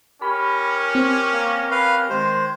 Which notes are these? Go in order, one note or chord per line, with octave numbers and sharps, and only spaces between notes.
C#4 G4 A#4 B5
C4
A#3
B4 F5
D#3 G#3 C5